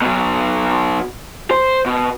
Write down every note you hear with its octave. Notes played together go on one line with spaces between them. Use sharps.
B2 F#3
C5
B2